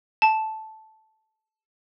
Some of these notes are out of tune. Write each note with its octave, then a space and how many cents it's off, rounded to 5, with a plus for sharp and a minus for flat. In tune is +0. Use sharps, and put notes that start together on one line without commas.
A5 -10